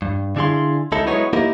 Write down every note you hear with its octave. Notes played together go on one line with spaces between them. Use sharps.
G2
D3 D4 E4 G#4 F5 C6
C#2 D#4 E4 A4
F#3 G#3 B3 D#4 E4 C#5
A#3 D#4 E4 G4 A#4 D#5